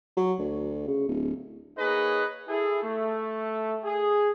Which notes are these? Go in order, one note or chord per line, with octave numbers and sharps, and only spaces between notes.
F#3
D2
C#3
D1
A#3 D#4 G#4 B4 C#5 D#5
E4 G#4 A4
A3
G#4